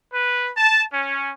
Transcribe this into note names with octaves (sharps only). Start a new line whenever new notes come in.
B4
A5
C#4